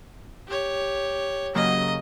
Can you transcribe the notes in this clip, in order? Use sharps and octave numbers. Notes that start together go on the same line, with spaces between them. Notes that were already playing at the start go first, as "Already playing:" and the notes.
G4 C#5
C#3 F#3 A#3 D#5